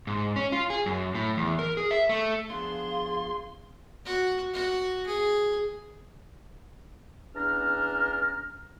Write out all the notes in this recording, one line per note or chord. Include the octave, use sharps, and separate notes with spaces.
G#2
C#4
F4
G#4
F#2
A2
E2
A#4
G#4
E5
A3
F3 B3 D4 G#4 F5 C6
F#4
F#4
G#4
E2 C#4 D4 A#5 F6